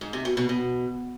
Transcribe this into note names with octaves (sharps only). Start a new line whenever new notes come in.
G#2
C3
B2
B2
B2